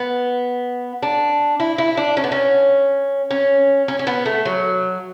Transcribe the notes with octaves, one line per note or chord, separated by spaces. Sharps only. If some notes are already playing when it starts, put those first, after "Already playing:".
Already playing: B3
D4
E4
E4
D4
C#4
B3
C#4
C#4
C#4
C#4
B3
A3
F#3